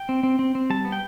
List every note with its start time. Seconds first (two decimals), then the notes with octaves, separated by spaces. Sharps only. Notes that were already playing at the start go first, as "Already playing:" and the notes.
Already playing: G5
0.09 C4
0.23 C4
0.39 C4
0.55 C4
0.70 G3 A5
0.85 B3
0.92 G5